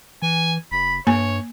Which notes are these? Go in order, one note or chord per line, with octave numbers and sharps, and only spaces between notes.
E3 G#5
F#1 B5
G2 A#3 C#5 G#5